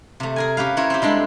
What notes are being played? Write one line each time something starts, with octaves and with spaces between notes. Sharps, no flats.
C3 A3
G#4 A#4 G#5
C#4 G4 B4 F5
C#4 E4 A#4 C5 C#5
C4 G4
G3 G#3 D4 A4